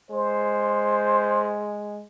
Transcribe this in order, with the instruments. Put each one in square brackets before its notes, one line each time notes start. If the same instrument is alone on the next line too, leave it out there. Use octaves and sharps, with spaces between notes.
[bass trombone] G#3 [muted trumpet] C5